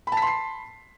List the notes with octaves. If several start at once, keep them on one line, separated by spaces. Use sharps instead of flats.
A5 B5 C6 B6 C7